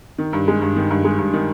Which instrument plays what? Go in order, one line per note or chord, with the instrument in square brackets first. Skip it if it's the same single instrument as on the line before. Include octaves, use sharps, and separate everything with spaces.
[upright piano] D#3
G2
G#3
G2
D#3
G2
G#3
G2
D#3